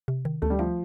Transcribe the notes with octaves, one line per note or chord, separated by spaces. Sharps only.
C3
D#3
D2 A3
G3
F3 A3